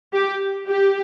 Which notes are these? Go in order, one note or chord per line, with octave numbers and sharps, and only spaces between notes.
G4
G4